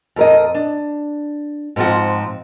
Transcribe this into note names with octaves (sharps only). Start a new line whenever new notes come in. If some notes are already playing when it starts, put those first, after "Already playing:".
F2 A#4 D#5
D4
G#2 D3 F3 C4 F#5